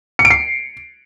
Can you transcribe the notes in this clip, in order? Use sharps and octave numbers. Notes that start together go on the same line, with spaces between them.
C#7
D7
C7